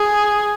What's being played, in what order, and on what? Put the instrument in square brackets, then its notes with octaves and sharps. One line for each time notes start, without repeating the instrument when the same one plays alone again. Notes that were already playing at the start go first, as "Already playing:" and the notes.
Already playing: [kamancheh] G#4